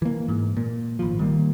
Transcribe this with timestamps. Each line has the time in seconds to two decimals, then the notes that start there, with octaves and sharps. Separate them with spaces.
0.02 E3 A#3
0.28 G#2
0.57 A#2
0.99 G#1 F3
1.19 D#3 G3 A#3